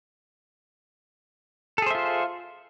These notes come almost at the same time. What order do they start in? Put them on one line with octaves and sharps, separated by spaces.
A4 G#4 C5 E5 F4